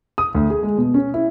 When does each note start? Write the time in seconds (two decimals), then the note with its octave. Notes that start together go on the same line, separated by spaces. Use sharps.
0.18 D#6
0.35 D2
0.50 G#4
0.63 G#3
0.78 B2
0.94 C#4
1.14 E4